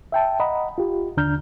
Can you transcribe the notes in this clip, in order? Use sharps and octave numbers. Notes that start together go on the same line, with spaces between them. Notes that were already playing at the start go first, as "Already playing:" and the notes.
E5 G5 A5
D#5 F#5 A#5 B5
F4 G4
D#2 D3 D4 A#5 F6 G6